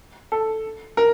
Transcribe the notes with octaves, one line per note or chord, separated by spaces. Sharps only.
A4
A#4